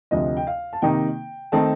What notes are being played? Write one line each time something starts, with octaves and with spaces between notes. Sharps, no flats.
D2 C3 F3 D#5
G5
F5
A5
C3 D#3 A#3 D#4 G5
D#3 A3 C4 D#4 A5